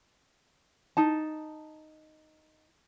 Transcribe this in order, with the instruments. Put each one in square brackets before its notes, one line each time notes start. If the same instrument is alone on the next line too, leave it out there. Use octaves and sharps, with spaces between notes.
[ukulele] D#4 A5